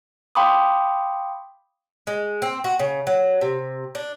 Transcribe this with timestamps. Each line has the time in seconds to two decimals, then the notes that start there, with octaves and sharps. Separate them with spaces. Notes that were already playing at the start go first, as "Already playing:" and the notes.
0.35 F5 G5 B5 C6 D6 D#6
2.07 G#3
2.42 C4
2.64 F#4
2.79 C#3
3.07 F#3
3.41 C3
3.95 D4